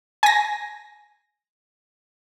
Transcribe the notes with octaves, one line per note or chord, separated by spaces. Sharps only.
G#5 A#6